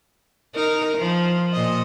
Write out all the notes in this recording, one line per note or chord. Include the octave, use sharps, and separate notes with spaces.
D#4 A#4
F3
A#2 D#5